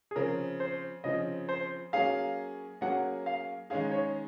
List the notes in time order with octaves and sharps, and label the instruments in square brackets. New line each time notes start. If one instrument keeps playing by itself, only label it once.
[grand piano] G#4
[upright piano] C#3 F3 C4 [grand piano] A#4
[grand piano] C5
[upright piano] C#3 F3 C4 [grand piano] D#5
[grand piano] C5
[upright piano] F#3 A#3 C#4 G#4 [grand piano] F5
[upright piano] F#3 A#3 C#4 G#4 [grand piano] F#5
[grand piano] F5
[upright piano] D#3 G#3 C#4 G#4 [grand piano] F5
[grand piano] C#5